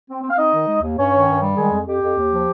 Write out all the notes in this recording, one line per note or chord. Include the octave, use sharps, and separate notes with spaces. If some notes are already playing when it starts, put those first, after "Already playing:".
C4
C4
F5
C4 D#4 D#5
D#3
G#3
D#2
G2 C#4 C#5
D#3
G2
G3
D#3 G#3 G#4
F2
F2 G4
F2
D#2
F3